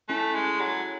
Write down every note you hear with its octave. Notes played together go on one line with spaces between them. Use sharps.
A3 C#4 E4 A4
G#3
F#3